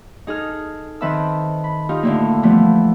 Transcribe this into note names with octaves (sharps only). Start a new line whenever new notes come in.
D#4 G#4 A4 F6
D#3 C4 B4 E5 A5 E6
B5
D#4 F4 G4 A#4
A2 D3 A#3
E3 F3 G3 A3 B3